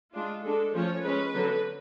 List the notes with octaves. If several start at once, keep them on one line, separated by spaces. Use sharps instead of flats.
G#3 D4 F4
G#3 D4 A4
F3 A3 C#4 C#5
G#3 C#4 B4
D3 F#3 B3